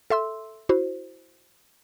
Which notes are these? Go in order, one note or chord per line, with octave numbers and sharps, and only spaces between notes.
A4 E5 C6 E6
E4 F#4 C5